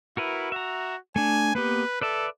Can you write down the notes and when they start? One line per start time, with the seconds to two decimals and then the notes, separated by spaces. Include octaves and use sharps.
0.17 E4 F#4 A#4 B4
0.52 F#4 E5 A#5
1.16 A3 D4 G#5
1.55 A#3 B3 G4 B4
2.01 A4 B4 D5 E5